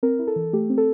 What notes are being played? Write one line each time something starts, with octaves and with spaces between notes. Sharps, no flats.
C4 A#4
E4
A4
E3
A3 G4
C4
A4